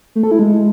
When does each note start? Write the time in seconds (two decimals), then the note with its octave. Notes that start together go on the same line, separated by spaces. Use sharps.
0.16 A3
0.23 A4
0.31 E4
0.39 G#3